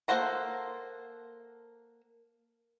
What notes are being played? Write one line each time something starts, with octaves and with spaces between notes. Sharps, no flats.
A#3 A4 C5 F#5 A#5